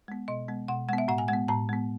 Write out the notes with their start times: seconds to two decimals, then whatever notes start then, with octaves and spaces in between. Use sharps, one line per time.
0.08 G#3 B3
0.28 B2 D#5
0.49 G#3 B3
0.68 B2 F#5
0.89 G#3 B3 F#5
0.98 E5
1.08 A2 F#5
1.18 G#5
1.28 G#3 F#5
1.33 B3
1.48 A2 A5
1.69 G#3 B3